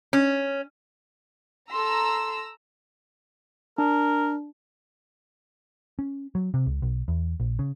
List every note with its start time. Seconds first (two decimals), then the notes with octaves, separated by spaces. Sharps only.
0.13 C#4
1.71 A4 A#5 C6 E6
3.78 D4 A#4
5.99 C#4
6.35 F#3
6.54 C3
6.66 C#2
6.82 B1
7.08 E2
7.40 A#1
7.59 C#3